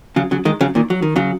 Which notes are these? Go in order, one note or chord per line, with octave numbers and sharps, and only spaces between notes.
C#3 F#3
C#3 F#3
D#3 G#3
C#3 F#3
A#2 D#3
F#3
D#3
C#3 F#3